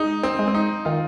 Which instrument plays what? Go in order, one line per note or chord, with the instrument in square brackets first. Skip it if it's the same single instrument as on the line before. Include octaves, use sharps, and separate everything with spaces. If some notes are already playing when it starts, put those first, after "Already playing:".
Already playing: [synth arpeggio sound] G#3 [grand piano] D#4
[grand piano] C4
[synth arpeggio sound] G#3
[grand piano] C4
D#4
[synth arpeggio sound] D#3 [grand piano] F4